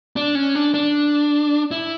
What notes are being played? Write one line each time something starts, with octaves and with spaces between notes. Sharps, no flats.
D4
C#4
D4
D4
E4